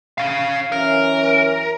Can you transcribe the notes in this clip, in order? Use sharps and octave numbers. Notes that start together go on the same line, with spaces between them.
C#4 F5
F#2 E3 C#4 A#4